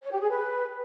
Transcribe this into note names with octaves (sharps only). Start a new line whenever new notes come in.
C#5
G4
G#4
B4